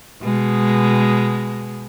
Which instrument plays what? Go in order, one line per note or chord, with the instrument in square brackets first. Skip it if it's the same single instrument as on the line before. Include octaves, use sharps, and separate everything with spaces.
[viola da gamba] B2 G#3